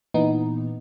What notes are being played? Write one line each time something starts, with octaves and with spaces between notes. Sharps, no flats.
A#2 E3 B3 D#4